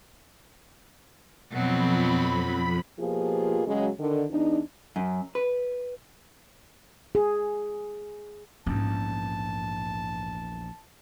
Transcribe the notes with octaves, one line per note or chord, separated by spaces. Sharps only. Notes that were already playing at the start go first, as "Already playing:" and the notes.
F2 B2 F#3 C4 B5
B2 F3 A#3 F4 G4 G#4
C#3 F#3 G#3
D3 D#3
E2 D4 D#4
F#2
B4
G#4
A#1 E2 G#2 C#4 A5